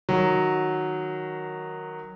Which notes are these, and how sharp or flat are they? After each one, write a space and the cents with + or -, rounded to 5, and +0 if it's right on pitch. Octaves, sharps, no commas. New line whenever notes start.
D#3 +0 F#3 +0